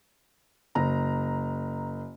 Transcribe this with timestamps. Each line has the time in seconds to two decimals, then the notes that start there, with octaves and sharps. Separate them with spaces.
0.75 F#1 A#5